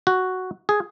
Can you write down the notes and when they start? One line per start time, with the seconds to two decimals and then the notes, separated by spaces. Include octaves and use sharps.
0.07 F#4
0.69 G#4